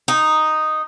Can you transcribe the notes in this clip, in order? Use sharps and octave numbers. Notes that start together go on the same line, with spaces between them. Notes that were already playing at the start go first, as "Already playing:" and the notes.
D#4